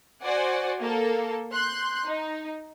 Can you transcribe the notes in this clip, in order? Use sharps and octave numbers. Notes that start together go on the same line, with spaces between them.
F#4 C5 D5 F#5 G#5
A#3 A4
C6 F#6 G6
D#4